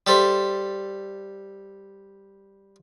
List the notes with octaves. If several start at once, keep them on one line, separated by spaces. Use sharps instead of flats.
G3 A4 C5 E5